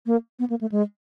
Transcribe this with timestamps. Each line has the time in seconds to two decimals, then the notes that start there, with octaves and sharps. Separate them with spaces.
0.06 A#3
0.39 B3
0.50 A#3
0.61 A3
0.72 G#3